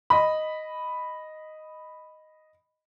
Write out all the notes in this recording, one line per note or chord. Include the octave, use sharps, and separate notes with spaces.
D#5 B5